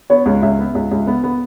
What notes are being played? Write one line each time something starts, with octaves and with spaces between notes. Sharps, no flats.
B3 C#5
C#2
C#2 E5
B3
C#2
C#2
B3
B3